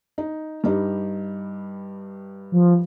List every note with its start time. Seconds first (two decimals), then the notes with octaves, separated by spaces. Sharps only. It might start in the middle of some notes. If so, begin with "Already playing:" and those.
0.18 D#4
0.64 G2 G3 D#4
2.52 F3